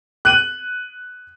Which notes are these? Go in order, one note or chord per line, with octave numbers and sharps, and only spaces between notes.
F#6 D#7 F#7